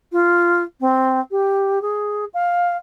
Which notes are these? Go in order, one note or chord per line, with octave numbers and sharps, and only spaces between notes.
F4
C4
G4
G#4
F5